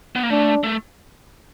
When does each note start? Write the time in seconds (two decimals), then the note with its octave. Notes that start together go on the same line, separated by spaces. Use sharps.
0.16 B3
0.23 A#3
0.30 A3 D4
0.64 A3